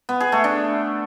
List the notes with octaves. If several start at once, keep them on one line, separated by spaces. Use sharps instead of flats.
B3
G#4
A3
D4